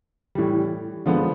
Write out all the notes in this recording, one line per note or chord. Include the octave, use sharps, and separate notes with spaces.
A2 E3 G3
D3 F3 G#3 B3